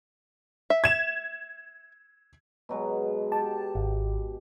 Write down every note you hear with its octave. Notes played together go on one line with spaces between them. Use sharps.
E5
G#6 E7
B2 F#3 G#3
G4 A5
G#1